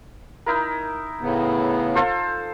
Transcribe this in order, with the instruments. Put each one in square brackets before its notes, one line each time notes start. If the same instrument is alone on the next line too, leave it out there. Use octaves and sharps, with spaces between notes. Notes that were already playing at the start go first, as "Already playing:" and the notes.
[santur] D#4 E4 A#4
[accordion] A2 C#3 B3
[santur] F4 A4 C5